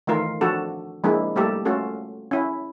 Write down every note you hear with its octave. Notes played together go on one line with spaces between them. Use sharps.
D#3 E3 A3 F4 A#4
F3 D4 F#4 A4
F3 G#3 A#3 D4 E4
G3 A3 A#3 G4 A4 A#4
A3 C#4 F4 F#4 A4
C#4 E4